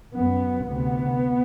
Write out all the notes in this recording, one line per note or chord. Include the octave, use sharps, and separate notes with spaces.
F#2 B3
D2 C3 B3